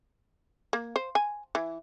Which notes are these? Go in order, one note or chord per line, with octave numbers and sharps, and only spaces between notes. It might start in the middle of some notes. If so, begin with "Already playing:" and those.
A#3
C5
G#5
E3